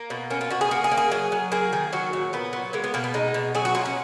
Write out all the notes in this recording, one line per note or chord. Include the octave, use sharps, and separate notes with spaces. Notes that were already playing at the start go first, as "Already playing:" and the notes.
Already playing: A#3
B2
A#3 C#4
F4
B2 F#4
G#4
A#3 F#4
G#4
A#3
G#4
F#3
F#3
A#3 G#4
D#3 G#4
F#3 F#4
A#2
A#2 B3
F#3
G#3 A#3
B3
B2 A#3
B3
G#3 D#4
B2
F#3 G#4
F#4
A#3 F4
C#4